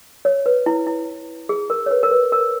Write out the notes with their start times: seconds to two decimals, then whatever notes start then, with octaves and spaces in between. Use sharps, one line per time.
0.25 C#5
0.46 B4
0.66 E4
0.87 E4
1.49 G#4
1.70 A#4
1.86 C#5
1.91 B4
2.03 A#4
2.11 B4
2.32 A#4